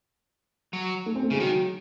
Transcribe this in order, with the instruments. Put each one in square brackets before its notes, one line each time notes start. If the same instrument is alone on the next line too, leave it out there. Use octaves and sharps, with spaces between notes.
[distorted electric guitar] F#3
[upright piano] A3
C4
A3
[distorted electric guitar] C#3 [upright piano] G#3
[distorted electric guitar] D#3 [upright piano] F#3